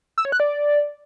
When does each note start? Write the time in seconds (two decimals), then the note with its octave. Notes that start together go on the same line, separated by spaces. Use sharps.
0.18 E6
0.25 C#5
0.32 F#6
0.40 D5